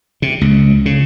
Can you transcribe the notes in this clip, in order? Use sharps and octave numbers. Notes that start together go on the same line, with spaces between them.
C3
C#2
C#3